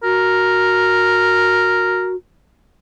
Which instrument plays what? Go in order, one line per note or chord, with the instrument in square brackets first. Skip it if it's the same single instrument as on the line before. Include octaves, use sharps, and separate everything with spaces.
[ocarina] F#4 [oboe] A#4